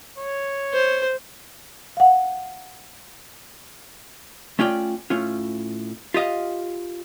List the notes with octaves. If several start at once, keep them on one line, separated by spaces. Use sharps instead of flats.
C#5
C5
F5 F#5
A3 C#4 F4 D5 G5
A2 C#4 F4
F4 G4 D#5 F5